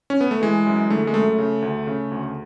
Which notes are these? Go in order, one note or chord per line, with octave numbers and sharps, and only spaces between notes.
C#4
B3
A3
E3 G#3
F#2
D3 A3
G#3
F#2 A3
C#3
D2
C#3
D2